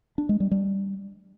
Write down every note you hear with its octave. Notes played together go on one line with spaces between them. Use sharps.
D4
G#3
G3
G3